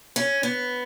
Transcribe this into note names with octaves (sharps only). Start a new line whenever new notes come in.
C#4
B3